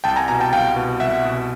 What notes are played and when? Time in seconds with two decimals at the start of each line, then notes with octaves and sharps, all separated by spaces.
0.04 C2 G5 A5
0.16 G#5 A#5
0.28 B2 G#5 A#5
0.40 G5 A5
0.53 C2 F5 G5
0.76 B2
1.00 C2 E5 F#5
1.25 B2